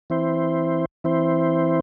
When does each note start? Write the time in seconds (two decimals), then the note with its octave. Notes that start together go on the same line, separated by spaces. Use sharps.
0.10 E3 C4 E4 C5
1.04 E3 C4 E4 C5